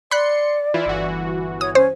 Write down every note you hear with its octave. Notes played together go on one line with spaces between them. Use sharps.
D5 B5 C6 F#6 C#7
E3 E4 F4
G1 E3 F#4
C#5 D#6
C#4 C5